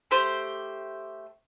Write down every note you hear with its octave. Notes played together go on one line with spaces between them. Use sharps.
A3 G4 C5